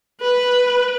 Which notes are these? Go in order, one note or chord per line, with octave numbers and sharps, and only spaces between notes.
B4